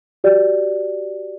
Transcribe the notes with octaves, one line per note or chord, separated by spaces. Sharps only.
F#4 G4 D5